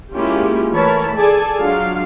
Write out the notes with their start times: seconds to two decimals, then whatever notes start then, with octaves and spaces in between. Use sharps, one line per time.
0.14 G#3 A#3 C#4 E4 F4 G4
0.72 E3 A3 A#4 C#5 A5 B5
1.16 G#4 A4 D5 G#5 A5
1.58 F#3 G#3 D4 F4 F5